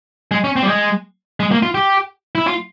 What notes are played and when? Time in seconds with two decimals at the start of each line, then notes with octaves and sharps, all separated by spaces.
0.31 G#3
0.44 C#4
0.56 C4
0.63 G3
0.67 G#3
1.40 G#3
1.51 A#3
1.63 F4
1.75 G4
2.35 E4
2.47 F4